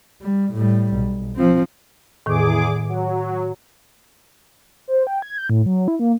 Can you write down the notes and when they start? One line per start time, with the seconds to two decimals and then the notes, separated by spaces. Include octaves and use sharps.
0.22 G3
0.53 A2 G3
0.95 B1
1.35 F3 C4
2.26 E2 A2 D#3 G#4 D6
2.89 F#3
4.88 C5
5.07 G5
5.22 G#6
5.38 G6
5.49 A2
5.66 F#3
5.88 E4
5.99 A#3